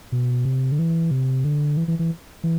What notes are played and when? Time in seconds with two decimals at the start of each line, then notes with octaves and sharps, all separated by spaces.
0.12 B2
0.45 C3
0.72 D3
0.79 E3
1.11 C3
1.44 D3
1.77 E3
1.88 E3
1.99 E3
2.44 E3